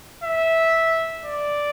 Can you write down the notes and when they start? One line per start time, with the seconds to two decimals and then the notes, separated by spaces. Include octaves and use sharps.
0.24 E5
1.25 D5